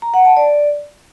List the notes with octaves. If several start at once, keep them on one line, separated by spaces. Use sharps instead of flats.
A#5
F#5
A5
D5